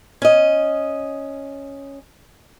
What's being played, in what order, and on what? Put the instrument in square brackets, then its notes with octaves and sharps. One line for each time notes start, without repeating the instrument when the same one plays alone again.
[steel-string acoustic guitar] C#4 D#5